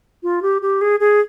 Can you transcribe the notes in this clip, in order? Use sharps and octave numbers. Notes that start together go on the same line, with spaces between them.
F4
G4
G4
G#4
G#4